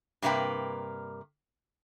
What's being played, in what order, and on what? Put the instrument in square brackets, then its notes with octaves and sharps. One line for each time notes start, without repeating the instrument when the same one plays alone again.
[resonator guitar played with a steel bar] G2 C3 A#3 A#4 B4 G5